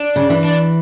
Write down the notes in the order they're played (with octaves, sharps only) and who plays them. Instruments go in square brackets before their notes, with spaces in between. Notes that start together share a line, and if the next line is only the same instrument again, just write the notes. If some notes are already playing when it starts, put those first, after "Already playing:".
Already playing: [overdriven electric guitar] D4
[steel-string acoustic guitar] C#3
E3
[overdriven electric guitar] D4